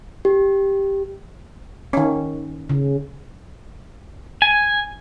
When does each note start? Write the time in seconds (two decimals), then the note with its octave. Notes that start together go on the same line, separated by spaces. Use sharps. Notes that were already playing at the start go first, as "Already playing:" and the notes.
0.25 G4
1.93 D#3 C#4
2.69 C#3
4.42 G#5